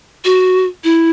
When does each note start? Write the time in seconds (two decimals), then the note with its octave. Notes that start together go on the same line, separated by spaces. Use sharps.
0.25 F#4
0.84 E4